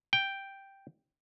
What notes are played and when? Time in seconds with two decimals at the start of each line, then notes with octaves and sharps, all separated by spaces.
0.13 G5